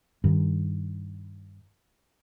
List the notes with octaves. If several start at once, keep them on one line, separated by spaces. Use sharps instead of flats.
G2 D#3